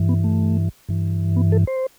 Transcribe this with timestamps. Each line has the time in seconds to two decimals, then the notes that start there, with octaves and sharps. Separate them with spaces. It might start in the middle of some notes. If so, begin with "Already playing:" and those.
Already playing: G2 E3
0.09 B3
0.24 A3
0.89 G2 E3
1.36 B3
1.52 A4
1.67 C5